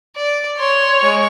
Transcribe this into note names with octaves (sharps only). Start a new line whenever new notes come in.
D5
C#5 C6
G#3 C#6